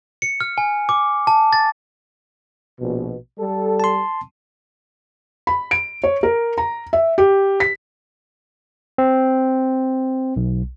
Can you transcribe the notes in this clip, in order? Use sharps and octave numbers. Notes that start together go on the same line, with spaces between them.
C#7
F6
G#5
D6
A5
A6
A#1 B2
G3 A4
A5 C6
B5
D7
C#5
A#4
A#5
E5
G4
B6
C4
B1